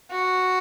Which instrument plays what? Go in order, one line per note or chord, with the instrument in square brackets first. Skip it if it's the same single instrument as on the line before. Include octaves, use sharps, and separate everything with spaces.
[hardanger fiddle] F#4